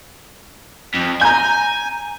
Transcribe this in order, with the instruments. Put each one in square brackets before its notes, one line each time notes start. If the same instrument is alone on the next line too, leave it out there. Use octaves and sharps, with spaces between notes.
[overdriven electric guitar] F2
[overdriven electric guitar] G#5 [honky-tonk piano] A#5 G6